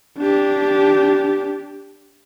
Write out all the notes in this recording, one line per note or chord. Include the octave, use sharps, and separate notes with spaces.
D4 G4